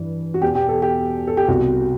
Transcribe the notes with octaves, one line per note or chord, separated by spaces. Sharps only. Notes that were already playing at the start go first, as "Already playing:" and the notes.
Already playing: G2 E3
F#4
E2 B2 G4
G4
A4
G4
A4
G4
C2 B2 F#4